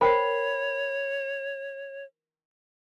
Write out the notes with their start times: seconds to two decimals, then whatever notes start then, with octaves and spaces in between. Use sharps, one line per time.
0.01 A#4 C5 C#5 G5 B5 C7